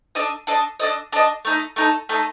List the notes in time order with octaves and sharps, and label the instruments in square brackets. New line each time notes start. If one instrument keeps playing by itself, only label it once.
[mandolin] D4 A4 D#5
D4 A4 D#5
D4 A4 D#5
D4 A4 D#5
A3 D#4 A4
A3 D#4 A4
A3 D#4 A4